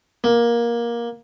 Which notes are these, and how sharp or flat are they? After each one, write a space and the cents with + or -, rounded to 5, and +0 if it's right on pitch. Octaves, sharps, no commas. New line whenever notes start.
A#3 +15